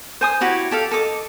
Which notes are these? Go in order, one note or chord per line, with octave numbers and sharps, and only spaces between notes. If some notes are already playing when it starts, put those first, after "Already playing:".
C5 G#5 D#6
E4 F#4 G4 C#5
G4 A4 F5
A4 D#5 D6